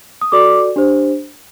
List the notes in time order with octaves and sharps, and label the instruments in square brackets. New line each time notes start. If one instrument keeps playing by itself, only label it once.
[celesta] D#6
F#4 A4 D5 D6
D4 G4 C5